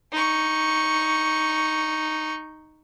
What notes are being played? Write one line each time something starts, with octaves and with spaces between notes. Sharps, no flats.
D#4 C#6